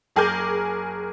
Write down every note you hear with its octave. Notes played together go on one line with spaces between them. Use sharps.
F#1 G#4 A#4 G#5 D6 G6